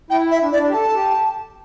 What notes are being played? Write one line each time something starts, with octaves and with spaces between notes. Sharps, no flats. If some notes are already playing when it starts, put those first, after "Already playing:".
E4 G5
E5
D4
E4 D5
D4
G4
A4 A5
A4
G4